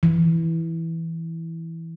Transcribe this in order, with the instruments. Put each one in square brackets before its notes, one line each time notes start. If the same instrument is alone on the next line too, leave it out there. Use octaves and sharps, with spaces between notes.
[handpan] E3